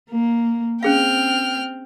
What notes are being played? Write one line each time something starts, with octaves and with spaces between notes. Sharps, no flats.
A#3
C4 C#4 G#4 F5 G5 F6